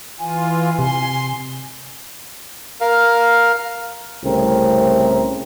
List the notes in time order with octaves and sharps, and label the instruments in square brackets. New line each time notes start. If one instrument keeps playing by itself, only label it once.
[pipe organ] E3 F4 [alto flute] G#5
[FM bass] C3 [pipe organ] C6
[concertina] A#4 F5
[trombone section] C2 A2 C#3 A3 C4 A#4